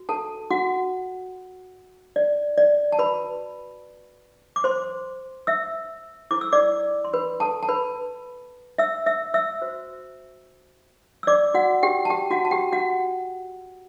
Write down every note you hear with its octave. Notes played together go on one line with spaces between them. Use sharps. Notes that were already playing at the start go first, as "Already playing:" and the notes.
Already playing: F#4
A4 A5
F#4 F#5
D5
D5
A5
F#4 B4 B5
D6
C5 C6
E5 E6
E4 A4 C5 D6
E6
D5 D6
C6
B4 B5
A4 A5
A5
B4 B5
E5 E6
E5 E6
E5 E6
F#4 C5
E6
D5 D6
F#4 F#5
G4 G5
A5
G4 G5
F#4 F#5
A5
G4 G5
F#4 F#5